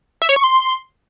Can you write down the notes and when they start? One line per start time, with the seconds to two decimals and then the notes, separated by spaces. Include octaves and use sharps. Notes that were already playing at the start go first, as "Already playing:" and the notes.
0.22 E5
0.29 C#5
0.36 C#6
0.44 C6